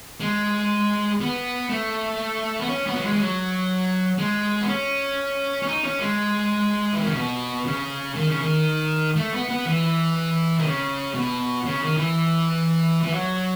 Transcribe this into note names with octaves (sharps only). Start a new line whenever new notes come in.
G#3
B3
A3
B3
C#4
B3
F#3
G#3
G#3
F#3
G#3
B3
C#4
C#4
D#4
C#4
G#3
E3
D#3
C#3
B2
C#3
D#3
C#3
D#3
A3
B3
B3
E3
D#3
C#3
B2
C#3
D#3
E3
E3
F#3